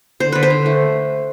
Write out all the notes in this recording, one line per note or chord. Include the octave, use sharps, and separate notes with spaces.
D3 C5
D3 B4
C5
D3
A3